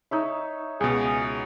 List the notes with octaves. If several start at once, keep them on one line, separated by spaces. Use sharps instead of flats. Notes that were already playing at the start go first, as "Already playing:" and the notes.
D#4 C#5 E5
C#2 B2 G#4